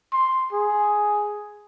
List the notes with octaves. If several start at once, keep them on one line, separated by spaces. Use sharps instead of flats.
C6
G#4